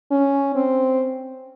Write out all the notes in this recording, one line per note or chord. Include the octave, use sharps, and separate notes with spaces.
C#4
C4